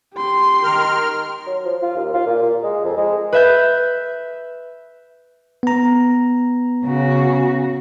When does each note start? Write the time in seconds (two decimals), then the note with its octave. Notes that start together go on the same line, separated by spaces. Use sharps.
0.15 G4 C6
0.64 D#3 A#4 F6
1.47 F#3
1.65 F3
1.82 F4
1.96 D#2
2.14 F4
2.27 A#2
2.42 A#2
2.63 G#3
2.84 F2
2.97 G#3
3.32 B4 E5 G6
5.63 B3 A#5
6.85 C#3 F#4